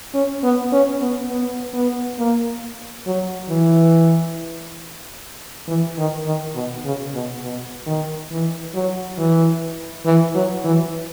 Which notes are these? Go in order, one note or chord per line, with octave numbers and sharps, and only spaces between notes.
C#4
B3
C#4
B3
B3
B3
A#3
F#3
E3
E3
D#3
D#3
B2
C#3
B2
B2
D#3
E3
F#3
E3
E3
F#3
E3